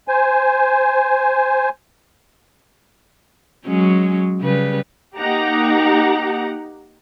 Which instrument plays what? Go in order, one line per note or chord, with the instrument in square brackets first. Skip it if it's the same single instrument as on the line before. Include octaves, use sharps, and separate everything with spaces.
[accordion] C5 G#5
[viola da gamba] F#3 G#3 C#4
C#3 G3 B4
[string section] A#3 D#4 G4 F#5 A#5